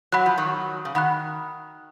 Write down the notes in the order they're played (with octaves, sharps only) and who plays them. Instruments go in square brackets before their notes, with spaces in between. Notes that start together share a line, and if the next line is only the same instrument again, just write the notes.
[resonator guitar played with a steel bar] F#3 [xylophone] F#5 B5 F#6
[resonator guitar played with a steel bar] F3
D#3 F#3
C#3
[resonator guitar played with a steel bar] D#3 [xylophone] F#5 B5 F#6